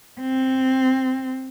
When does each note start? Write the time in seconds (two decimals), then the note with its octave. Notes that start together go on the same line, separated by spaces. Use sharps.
0.21 C4